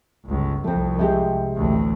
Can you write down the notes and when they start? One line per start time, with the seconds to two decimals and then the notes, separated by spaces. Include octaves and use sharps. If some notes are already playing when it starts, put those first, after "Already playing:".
0.25 G1 C#2
0.64 C2 F2 A3 C4
0.99 C3 G#3 G4
1.54 A1 D2